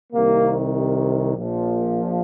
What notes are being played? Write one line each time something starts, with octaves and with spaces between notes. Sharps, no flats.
C2 C3 D#3 A#3
A#1 A#2 F3